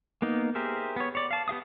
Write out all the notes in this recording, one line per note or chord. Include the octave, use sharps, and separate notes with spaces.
A#3 B3 D#4
G4 G#4 A#4 C5 E5
B3 C#5
C#5 D5
F5 A5
B3 G4 F5 D#6